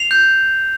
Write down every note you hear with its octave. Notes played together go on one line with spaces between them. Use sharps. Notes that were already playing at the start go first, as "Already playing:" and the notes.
Already playing: C7 F7
G6